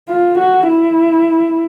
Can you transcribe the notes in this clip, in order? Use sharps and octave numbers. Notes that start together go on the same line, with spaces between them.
F4
F#4
E4